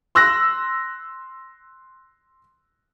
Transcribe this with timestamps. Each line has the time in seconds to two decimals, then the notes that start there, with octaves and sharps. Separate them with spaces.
0.15 C6 E6 F#6 A#6